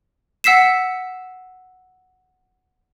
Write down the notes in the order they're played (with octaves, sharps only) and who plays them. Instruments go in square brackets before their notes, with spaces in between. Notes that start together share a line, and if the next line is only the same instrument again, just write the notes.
[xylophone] F#5 E6 B6 C7 E7